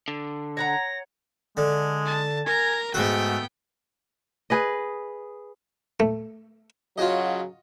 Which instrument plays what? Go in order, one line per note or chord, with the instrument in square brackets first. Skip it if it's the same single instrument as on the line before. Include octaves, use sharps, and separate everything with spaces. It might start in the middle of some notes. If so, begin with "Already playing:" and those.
[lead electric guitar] D3
[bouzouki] C#5 F#5 A#5 [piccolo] A#6
[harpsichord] D3 [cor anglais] G#3
[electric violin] A5
[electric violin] A#4 A#5 [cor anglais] G#5
[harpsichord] G#2 F#4 [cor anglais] A3 [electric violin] B3 G5
[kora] G#4 B4 D#5
[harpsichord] A3
[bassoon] C#3 [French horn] F#3 [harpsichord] F4 F#4 D#5